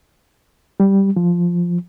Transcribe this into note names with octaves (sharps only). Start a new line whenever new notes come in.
G3
F3